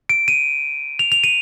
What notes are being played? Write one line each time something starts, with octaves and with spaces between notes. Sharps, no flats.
D7
D#7
F7
F7
D#7